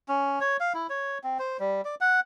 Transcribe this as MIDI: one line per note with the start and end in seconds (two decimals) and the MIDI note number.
0.09 0.39 61
0.41 0.57 73
0.60 0.73 77
0.74 0.87 64
0.90 1.18 73
1.24 1.38 60
1.39 1.57 72
1.60 1.81 55
1.85 1.95 74
2.01 2.20 78